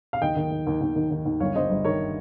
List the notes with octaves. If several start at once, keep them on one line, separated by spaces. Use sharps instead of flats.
F5
D#2 D#5 G5
D#3
D#3
D#2
D#2
D#3
D#3
D#2
G1 C#5 F5
G2 C5 D#5
G1
D#3 A#4 C#5